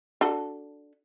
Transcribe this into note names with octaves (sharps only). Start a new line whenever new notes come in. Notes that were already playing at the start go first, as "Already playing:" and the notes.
D4 F#4 A4